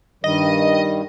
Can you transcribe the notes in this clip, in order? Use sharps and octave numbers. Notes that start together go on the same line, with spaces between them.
G2 D#3 G3 D#5